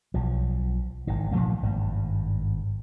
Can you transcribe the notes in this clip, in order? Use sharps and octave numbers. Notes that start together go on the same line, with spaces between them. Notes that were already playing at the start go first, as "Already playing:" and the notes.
B1 F3
G#1 D#3
A#2 F3 A3 A#3
G#1 G2